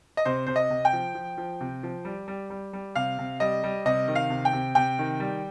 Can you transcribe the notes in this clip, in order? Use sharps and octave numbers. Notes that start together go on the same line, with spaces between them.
D#5
C3 C5
C3 C5
D#5
C3
G5
F3
F3
F3
C3
F3
G3
G3
G3
G3
C3 F5
C3
G3 D#5
G3
C3 D#5
D#3
F5
C3
G5
C3
C3 G5
D#3
G3